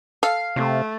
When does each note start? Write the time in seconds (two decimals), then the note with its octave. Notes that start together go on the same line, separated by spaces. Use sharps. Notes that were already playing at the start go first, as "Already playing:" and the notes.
0.23 A4 F5
0.56 C3 A3